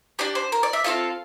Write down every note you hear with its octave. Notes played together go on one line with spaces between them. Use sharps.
D4 G4 D5
C5
A#4
D5
E5
C4 F4 A4 F5